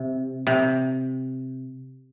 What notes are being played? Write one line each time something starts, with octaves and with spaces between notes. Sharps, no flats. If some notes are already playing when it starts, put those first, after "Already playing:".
Already playing: C3
C3